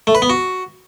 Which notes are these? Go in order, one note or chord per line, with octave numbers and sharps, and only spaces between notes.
A3
B4
B3
F#4